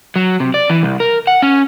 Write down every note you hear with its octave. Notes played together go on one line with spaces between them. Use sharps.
F#3
C3
D5
E3
C2
A#4
F#5
C#4